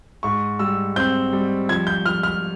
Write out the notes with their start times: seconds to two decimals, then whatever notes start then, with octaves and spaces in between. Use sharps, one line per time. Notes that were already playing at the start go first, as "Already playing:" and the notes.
0.23 G#2 C#6
0.59 G3 E6
0.96 C4 G6
1.33 G3
1.69 F3 G#6
1.87 G6
2.06 F3 F6
2.23 F6